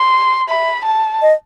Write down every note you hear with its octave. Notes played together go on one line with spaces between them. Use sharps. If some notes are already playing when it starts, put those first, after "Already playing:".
Already playing: C6
E5 B5
A5
D#5